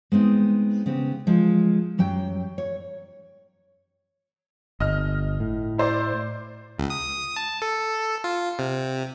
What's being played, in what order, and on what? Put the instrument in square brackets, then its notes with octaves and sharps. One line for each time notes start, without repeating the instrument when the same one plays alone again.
[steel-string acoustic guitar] G#3 B3 C4 D#4
C#3 B3 C4 G4
F3 G#3
F#2 F#3 G4 G5
C#5
[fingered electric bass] G1 [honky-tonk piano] D#5 F6
[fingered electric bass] A2
[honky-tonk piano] E4 C5 D5
[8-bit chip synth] C#2
D#6
A5
A4
F4
C3